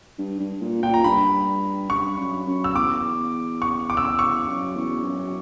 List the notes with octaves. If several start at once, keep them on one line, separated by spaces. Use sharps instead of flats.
G2
G2
A#2
A#2 G5
A#5
G2 B5
G2 C#6
F#2
F#2
E6
E2 D6
C#6
D6
E6
D6
C#6
F#2
E2
F#2